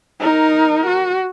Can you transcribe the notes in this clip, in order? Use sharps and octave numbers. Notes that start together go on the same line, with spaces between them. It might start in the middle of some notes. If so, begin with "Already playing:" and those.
D#4 A#4
F#4